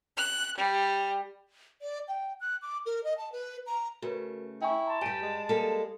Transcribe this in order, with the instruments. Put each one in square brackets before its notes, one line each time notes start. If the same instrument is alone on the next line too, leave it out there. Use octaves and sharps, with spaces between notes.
[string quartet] F#6
G3
[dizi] D5
G5
F#6
D6
A#4
D#5
A5
B4
A#5
[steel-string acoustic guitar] C#3 A3 [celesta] F#4 A#4 B4
[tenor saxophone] E4 [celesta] G5 G#5 C#6
[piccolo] A5 [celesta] A#5 C6
[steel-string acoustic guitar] G2 G3 [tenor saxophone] G4 [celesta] G#5 D7 D#7
[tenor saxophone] G#3
[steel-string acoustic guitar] G3 A#3 A4